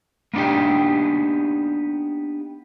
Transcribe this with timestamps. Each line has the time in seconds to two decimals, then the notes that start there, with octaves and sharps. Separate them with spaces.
0.34 A#3 B3 D4 D#4 G4